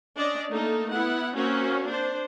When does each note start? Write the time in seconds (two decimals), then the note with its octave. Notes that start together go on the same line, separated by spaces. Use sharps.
0.16 C#4 D4 D5 D#5
0.50 A3 A#3 D#4 A4
0.92 B3 E4 F#5
1.35 A#3 C4 C#4 F#4
1.86 D4 C5